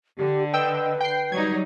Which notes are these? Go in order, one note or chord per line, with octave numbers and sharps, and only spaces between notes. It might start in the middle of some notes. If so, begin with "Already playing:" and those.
D3 G4
B4 D#5 G5 E6
G5 C7
F#3 G3 D#4 G#6